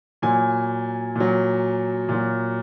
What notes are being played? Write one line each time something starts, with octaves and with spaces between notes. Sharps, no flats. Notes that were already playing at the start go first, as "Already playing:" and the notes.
A#2 F#3 G#5
A#2 F#3
A#2 F#3